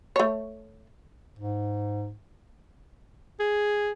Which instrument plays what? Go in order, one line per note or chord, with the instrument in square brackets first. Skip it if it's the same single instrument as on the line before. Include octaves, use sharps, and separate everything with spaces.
[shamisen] A3 C#5
[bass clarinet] G#2
[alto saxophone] G#4